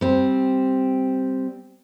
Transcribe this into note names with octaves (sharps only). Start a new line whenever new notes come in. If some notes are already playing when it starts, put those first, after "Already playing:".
G3 C4